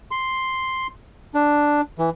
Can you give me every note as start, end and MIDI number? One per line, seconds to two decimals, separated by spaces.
0.11 0.87 84
1.35 1.81 62
1.99 2.10 52